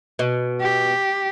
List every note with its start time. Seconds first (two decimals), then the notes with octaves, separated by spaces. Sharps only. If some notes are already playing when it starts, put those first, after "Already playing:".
0.19 B2
0.61 G4